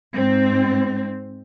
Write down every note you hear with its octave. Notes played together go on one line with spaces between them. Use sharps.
G#2 C4